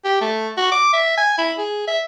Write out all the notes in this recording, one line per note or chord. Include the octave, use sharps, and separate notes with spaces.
G4
A3
F#4
D6
E5
G#5
E4
G#4
E5